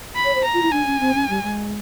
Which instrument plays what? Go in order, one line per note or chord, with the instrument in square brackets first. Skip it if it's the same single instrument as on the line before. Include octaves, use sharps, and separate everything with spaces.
[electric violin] B5
[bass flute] C#5
C5
[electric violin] A#5
[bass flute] F4
E4
[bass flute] D4 [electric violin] G#5
[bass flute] C#4
C4
C#4
G3
G#3